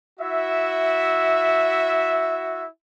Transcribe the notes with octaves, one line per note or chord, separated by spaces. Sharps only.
E4 F#4 E5